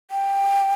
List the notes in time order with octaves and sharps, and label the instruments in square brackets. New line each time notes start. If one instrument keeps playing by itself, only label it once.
[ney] G5